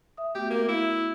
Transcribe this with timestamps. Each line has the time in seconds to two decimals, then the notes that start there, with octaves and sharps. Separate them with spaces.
0.17 E5 D#6
0.35 A3 B3 F#4 G4
0.50 A#3
0.68 E4